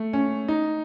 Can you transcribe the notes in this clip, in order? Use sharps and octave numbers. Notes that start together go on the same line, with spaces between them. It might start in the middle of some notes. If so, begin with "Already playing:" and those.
Already playing: A3
C#4
D#4